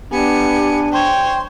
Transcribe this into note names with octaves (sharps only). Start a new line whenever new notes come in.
B3 D4 G4 G#5 C#7
C5 C#5 G5 C6